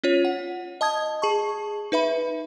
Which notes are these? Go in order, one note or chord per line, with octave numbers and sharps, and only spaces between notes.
C#4 F4 C#5
F#5
D#5 A5 D#6 G#6
G#4 A5 C#6
D#4 B4 E5 B5